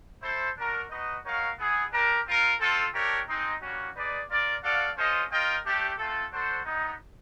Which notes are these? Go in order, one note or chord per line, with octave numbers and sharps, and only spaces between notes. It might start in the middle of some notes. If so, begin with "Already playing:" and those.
E4 A4 C5
D4 F#4 A#4
D#4 F#4 B4 D#5
D#4 F#4 A#4 C#5 F5
B3 E4 G#4
D4 G4 A#4
C4 F4 A#4
C4 F4 A4
A3 D4 G4 A#4 C#5
G#3 C4 D#4
G3 A#3 C#4 F#4
D#4 G#4 B4 D5
F4 A#4 D5
F#4 A4 D5 F5
C#4 F4 A4 C5 D#5
F4 A#4 D#5 G5
A3 D4 G4
A3 C4 F4 A4
D4 F#4 A4 C5
G3 B3 D#4